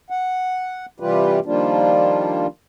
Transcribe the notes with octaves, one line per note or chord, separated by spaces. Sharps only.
F#5
C3 E3 G3 F4 G4 B4
D#3 F3 G3 A#3 D4 F4